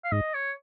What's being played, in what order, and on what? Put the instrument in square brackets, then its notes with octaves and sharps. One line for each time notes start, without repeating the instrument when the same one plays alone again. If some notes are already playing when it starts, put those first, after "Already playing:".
[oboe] F5
[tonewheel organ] G#2 [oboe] D#5
[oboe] C#5